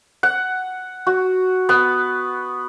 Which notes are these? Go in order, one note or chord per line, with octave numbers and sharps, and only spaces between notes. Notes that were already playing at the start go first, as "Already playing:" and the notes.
F#5
F#4
B3